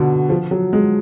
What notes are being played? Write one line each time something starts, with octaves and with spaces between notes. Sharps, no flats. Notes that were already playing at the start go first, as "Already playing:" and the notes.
Already playing: B2 D3
F3
F#3
G#3